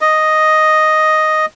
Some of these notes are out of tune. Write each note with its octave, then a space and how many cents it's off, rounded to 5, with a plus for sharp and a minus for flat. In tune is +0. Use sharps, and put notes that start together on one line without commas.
D#5 +0